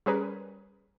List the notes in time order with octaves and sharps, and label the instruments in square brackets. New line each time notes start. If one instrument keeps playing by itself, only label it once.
[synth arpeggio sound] G3 C#4 G#4 A#4 B4